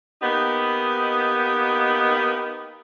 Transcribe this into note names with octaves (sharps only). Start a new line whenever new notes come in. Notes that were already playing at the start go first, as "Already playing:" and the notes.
A#3 B3 D#4 G4